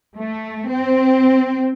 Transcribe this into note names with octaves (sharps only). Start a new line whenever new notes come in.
A3
C4